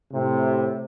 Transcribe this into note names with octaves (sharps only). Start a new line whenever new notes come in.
A2 C3